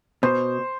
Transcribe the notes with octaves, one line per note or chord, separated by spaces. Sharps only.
B2 C5